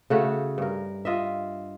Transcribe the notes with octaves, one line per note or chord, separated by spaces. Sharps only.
C#3 A3 F#4
G2 A#4
F4 D#5 E5